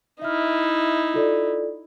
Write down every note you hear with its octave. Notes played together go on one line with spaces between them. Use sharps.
D#4 E4 E5 F6
F4 A4 D5